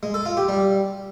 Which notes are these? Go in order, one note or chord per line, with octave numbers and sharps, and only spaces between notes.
G#3
A4
F4
G4
G3